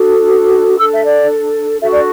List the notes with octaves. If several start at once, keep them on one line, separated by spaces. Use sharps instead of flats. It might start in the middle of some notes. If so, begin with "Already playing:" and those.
Already playing: D4 F#4 A4
D4 A4 E6
E5
D5
D4 F#4 A4 E5
D5